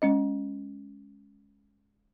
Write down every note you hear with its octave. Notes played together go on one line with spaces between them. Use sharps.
G#3 C#4 D#5